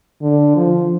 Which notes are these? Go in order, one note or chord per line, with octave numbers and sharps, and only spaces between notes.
D3
F3